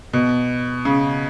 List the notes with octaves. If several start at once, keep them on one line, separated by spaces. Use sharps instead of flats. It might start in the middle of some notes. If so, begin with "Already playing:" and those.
B2
C#3